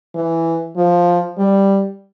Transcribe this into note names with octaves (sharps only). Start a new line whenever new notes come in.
E3
F3
G3